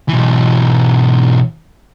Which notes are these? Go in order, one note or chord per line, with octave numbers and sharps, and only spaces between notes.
B1 E3